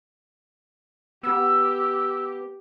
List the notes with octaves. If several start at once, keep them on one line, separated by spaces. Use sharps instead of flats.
B3 G4 E6